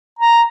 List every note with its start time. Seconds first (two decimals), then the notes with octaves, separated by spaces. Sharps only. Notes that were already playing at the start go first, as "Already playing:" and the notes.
0.19 A#5